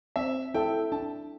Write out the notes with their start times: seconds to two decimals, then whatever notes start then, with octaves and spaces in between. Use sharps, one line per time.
0.16 C4 E5
0.54 E4 A4 E5 G5
0.92 D4 A5